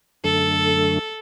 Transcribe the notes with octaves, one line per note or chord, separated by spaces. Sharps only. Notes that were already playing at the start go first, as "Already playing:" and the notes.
F#2 D3 A3 A4